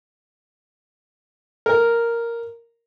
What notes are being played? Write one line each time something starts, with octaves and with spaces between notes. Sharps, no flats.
A#4